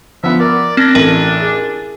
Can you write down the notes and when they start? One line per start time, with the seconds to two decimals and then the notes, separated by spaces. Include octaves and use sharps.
0.24 F3 B3 E5
0.40 A#4 D5
0.77 C4 D4 A#6
0.95 A1 A3 A#4
1.40 G#4